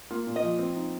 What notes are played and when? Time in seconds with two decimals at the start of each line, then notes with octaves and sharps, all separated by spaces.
0.11 A#3 F4
0.27 A#2
0.36 D#5
0.43 F3
0.59 C4
0.76 D#4